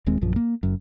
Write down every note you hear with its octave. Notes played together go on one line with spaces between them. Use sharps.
D#1 D#2 G#3 C4
A#1 F#2 F3
A#3
F#1 F#2